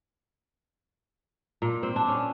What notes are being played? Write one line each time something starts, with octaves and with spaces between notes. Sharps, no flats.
A#2
C4
D4
C#4